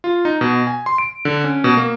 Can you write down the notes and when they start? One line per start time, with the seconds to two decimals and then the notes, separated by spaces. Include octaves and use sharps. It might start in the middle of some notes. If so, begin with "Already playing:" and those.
0.04 F4
0.25 D#4
0.41 B2
0.67 G#5
0.86 C6
0.98 D7
1.25 D3
1.44 C#4
1.64 B2
1.77 A#3